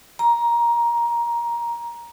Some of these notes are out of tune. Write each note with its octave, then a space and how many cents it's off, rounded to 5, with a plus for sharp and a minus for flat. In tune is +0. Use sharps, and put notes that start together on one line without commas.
A#5 +15